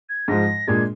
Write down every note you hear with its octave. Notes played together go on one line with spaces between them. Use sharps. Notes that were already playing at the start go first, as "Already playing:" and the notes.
G#6
G#2 F3 G#3 A#6
A#2 G#3 D4 G#4 G#6